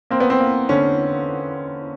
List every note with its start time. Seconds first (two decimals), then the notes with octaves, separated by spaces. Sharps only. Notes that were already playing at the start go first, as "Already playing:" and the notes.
0.11 A#3 C4
0.20 B3
0.30 C4
0.40 A#3
0.69 D3 C#4